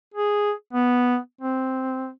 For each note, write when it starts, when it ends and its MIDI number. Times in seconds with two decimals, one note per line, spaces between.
0.14 0.52 68
0.73 1.18 59
1.41 2.10 60